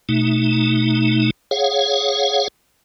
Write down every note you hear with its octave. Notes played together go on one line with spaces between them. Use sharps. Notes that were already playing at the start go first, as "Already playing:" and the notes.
B2 A3 D#4
G#4 C#5 F5 F#5